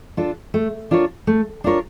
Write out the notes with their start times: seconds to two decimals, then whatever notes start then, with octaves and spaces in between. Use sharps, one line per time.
0.17 D4 F4 A4
0.54 A3
0.91 D4 F4 A#4 C#5
1.27 A3
1.64 D4 F4 A#4 C#5